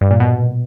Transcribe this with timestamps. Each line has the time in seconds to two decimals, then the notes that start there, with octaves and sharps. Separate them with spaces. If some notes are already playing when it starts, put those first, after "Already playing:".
0.01 G2
0.11 A#2
0.20 B2